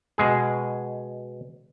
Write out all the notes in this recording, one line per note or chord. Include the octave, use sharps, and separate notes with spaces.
B2 G#3 G#4